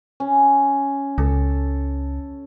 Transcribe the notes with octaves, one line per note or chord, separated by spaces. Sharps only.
C#4
C#2 A4